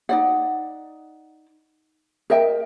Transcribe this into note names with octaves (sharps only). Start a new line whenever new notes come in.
D#4 D5 F#5
A#4 D#5 E5 G5